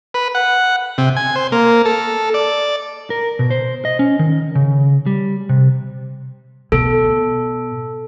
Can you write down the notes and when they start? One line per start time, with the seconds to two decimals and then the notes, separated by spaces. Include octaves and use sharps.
0.14 B4
0.35 F#5
0.98 C3
1.17 G#5
1.36 C5
1.52 A#3
1.85 A4
2.34 D5
3.10 A#4
3.39 B2
3.51 C5
3.85 D#5
3.99 C#4
4.19 D#3
4.55 C#3
5.06 G3
5.49 C3
6.72 B2 A4